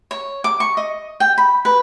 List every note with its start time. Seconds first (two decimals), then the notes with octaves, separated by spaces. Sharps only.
0.11 C#5
0.44 D6
0.60 C#6
0.77 D#5
1.20 G5
1.38 B5
1.65 B4